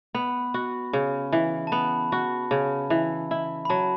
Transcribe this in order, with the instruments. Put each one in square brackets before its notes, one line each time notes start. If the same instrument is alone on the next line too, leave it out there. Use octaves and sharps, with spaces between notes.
[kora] B3 [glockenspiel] B5
[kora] F#4
C#3
E3
[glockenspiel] A5
[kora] B3 [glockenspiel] B5
[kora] F#4
C#3
E3
E4
[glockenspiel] B5
[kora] F#3 [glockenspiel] A5